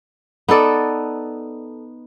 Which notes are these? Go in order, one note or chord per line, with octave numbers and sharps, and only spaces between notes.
B3 D#4 A4 D5